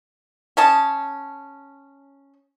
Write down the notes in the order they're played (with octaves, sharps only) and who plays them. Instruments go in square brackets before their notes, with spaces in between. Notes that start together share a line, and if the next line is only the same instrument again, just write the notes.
[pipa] C#4 D#5 A5